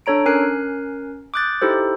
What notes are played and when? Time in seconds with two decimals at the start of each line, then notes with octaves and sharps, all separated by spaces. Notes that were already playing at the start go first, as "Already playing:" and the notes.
0.06 D4 A4 C#5 A#5 D7
0.26 C#4 A#4 G#5 F#6 C7
1.34 D6 D#6 F#6 G6 A6
1.62 D#4 E4 G4 A4 C5